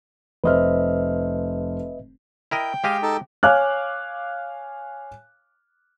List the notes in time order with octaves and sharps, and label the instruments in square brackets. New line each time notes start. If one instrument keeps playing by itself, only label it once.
[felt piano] F1 C5 F6 [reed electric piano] B4 D#5 E5
[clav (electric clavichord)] E4 A#4 D#5 [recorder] G5
[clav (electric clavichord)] G#3 G4 D#5 [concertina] F5
[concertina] D#4 A4
[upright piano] C#5 F5 G#5 D6 F6 F#6